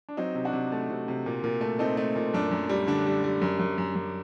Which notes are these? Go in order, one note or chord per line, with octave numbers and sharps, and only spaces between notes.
D4
F#3 C4 D#4
C3
D4 F#4
C3
A3
C3
C3
A#2
A#2
A3
A3 C4 D#4
A3
A#2
F#2 D4
F#2
G3
D3 D4
G3
G3
F#2
F#2
F#2
F#2